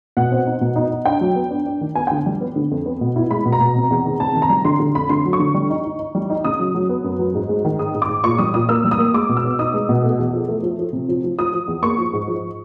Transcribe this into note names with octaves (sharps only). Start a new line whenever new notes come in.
B2 F#5
C4
D#4
B2
D#4
D#4
D4 G5
F#3
B3
D4
D4
D#3
B3 G#5
D3 G5
G3
B3
D3
F2
B3
B2
E4
G#3 B5
B2
A#5
B2
C3
E2
D#3
C3 A5
D#3
A#5
G3
D3 C6
D3
F2 B5
D3 C6
F#3
C#6
D3
G3
D#4
D#4
D#4
G3
D#4
C#3 D#6
F#3
F#3
B3
F#2
F#3
G#2
G#3
D#3
G#2 D#6
G#2
D6
G#2
A#2 C#6
G3 D#6
A#2 D#6
A#3 E6
G3
D#6
A#3
G#3 D6
B2
E6
B3
D#4 D#6
G#3
B2
A3
E2
F3
A3
F3
F3
C3
F3
F3
F3 D#6
F3
E2
A#3 C#6
F3
G#2
F3